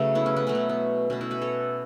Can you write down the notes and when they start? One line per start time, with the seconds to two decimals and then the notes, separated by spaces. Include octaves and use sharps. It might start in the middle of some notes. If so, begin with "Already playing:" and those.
Already playing: C#3 F#3 A3 B4 E5
0.15 B3 E4
0.26 C#4
0.36 B3
0.47 B2 F#3 A3 C#4
0.55 B3
0.69 B3
1.10 B2 B3 C#4
1.21 B3 E4
1.31 F#4 B4
1.42 A4 C#5